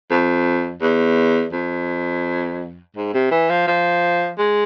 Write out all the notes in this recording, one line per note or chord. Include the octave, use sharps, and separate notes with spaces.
F2
E2
F2
G#2
C3
E3
F3
F3
G#3